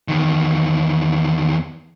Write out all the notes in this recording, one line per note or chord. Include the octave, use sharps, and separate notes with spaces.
E2 D#3